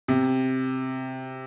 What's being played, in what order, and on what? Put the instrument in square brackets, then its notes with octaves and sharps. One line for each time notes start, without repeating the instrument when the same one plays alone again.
[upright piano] C3